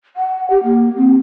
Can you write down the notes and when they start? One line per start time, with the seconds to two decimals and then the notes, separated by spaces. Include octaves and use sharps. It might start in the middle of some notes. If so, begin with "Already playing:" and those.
0.16 F#5
0.50 G4
0.64 A#3
0.96 C4